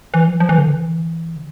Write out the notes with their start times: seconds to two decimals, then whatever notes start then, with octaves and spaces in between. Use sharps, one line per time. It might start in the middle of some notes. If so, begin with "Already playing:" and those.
0.14 E3
0.28 F3
0.40 F3
0.49 E3
0.58 D3
0.67 E3
1.36 D3